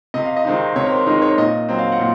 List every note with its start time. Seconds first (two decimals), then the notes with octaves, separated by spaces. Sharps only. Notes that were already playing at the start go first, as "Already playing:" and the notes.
0.14 C3 D#5
0.25 F5
0.36 D#5
0.45 D#3 G#3 C4 D#4
0.76 C3 C#5
0.86 A#4
0.91 C5
1.06 D#3 G#3 C4 D#4 A#4
1.22 C#5
1.38 A#2 D#5
1.69 F#3 C4
1.79 F5
1.92 F#5
1.99 A#2